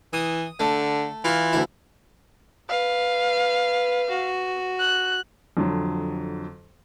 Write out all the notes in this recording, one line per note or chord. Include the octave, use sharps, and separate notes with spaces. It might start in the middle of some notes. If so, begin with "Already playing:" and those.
E3 D#6
D3 A3
E3 F4
D2 E4
B4 F5
F#4
F#6
F2 D3 F#3